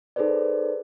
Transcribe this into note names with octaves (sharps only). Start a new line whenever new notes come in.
D#4 G#4 A4 B4 C5 D5